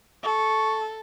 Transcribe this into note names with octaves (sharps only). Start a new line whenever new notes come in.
A4 C#6